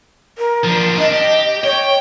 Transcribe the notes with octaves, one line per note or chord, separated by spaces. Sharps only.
A#4
F3 D4
D4 D#5
G4 D#5
C#5 G5